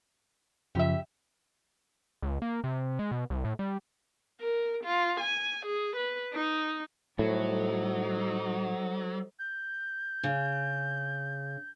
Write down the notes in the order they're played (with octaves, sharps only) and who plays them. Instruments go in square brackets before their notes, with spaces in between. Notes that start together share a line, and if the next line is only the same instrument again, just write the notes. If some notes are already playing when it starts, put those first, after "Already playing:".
[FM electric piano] F#2 C#3 F3 [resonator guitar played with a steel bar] G4 E5
[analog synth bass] C#2
A#3
C3
G#3
B2
C2
A2
G3
[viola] A#4
F4
G#5
G#4
B4
D#4
[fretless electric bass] A2 [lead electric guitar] F#3 [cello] G3 D#4 [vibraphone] A4 C5
[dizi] G6
[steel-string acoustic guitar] C#3